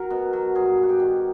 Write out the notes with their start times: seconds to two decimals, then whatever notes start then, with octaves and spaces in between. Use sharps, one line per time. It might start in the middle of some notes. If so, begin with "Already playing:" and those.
Already playing: F#3 A#4
0.10 B2
0.33 F#3
0.55 G2 G#4
0.78 G2
0.83 F#4
0.89 G4
1.00 D#3